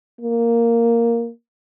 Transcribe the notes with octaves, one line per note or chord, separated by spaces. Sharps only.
A#3